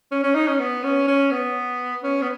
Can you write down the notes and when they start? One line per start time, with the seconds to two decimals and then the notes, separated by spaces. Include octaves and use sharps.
0.11 C#4
0.23 C#4
0.35 D#4
0.47 C#4
0.59 B3
0.84 C#4
1.08 C#4
1.31 B3
2.03 C#4
2.22 B3